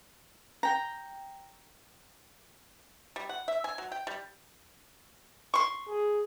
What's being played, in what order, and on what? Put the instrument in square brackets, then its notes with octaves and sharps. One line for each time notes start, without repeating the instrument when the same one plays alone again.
[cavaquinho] G5 A#5
[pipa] G3
F#5
E5
G#5
F#3
G5
G3
C6 C#6
[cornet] G#4